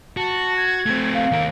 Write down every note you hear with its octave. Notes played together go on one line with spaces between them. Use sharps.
F#4 A5
G#6
A3 C4
F5
D#2 A#4